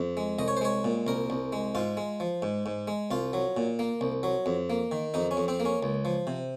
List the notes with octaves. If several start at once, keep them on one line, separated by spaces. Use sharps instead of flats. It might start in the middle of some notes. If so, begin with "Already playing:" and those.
Already playing: F2
G#3
C2 D#5
C#5
C5
G#3 C#5
A#2
C2 A#4
C2
G#3
G#2 F4
G#3
F3
G#2
G#2
G#3
C2 F4
F#3
A#2
A#3
C2
F#3
F2
A#3
D#3
F2 D#4
C#4
F2
C4
A#3
C#4
C#2
F3
C3